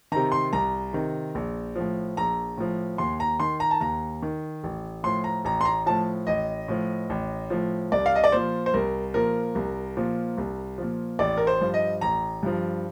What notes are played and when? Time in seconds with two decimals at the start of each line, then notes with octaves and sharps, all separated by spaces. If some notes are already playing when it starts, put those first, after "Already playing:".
0.12 C3 D#3 A#5
0.32 C6
0.53 C2 A#5
0.93 C3 D#3
1.35 A#1
1.76 A2 F3
2.17 A#1 A#5
2.57 A2 F3
2.98 D#2 C6
3.20 A#5
3.40 D#3 C6
3.60 A#5
3.71 A5
3.80 D#2 A#5
4.23 D#3
4.64 A1
5.04 A2 F3 C6
5.24 A#5
5.45 A1 A#5
5.61 C6
5.65 A#5
5.86 A2 F3 A5
6.27 A1 D#5
6.68 A2 F3
7.10 A1
7.50 A2 F3
7.92 C2 D5
8.06 F5
8.15 D#5
8.24 D5
8.32 A#2 F3 C5
8.66 C5
8.74 C2 A#4
9.14 A#2 F3 A#4
9.55 C2
9.97 A#2 F3
10.38 C2
10.78 A#2 F3
11.19 A1 D5
11.37 A#4
11.47 C5
11.61 G2 F3
11.74 D#5
12.01 A1 A#5
12.43 G2 F3